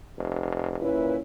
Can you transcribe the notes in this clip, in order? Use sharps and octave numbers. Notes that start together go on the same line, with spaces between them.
F1
A#2 C#4 E4 B4